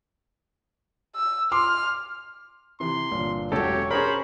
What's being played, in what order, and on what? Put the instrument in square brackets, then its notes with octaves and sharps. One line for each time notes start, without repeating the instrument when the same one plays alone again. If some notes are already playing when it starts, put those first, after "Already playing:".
[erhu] E6
[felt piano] C6 D6 [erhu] F6
[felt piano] C3 E3 [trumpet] C6
[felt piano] G1 A#2
[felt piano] E1 F#2 F#4 [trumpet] G4 [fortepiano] A4 [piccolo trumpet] C#5
[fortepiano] C#4 G#4 A#4 [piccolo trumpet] C5 [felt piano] C#5 [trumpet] B5